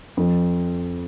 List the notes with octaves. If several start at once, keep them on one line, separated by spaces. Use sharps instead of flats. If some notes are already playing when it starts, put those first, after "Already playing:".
F2